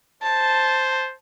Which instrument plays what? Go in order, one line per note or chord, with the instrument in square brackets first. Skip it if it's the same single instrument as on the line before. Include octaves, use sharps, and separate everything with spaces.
[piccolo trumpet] C5 [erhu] A5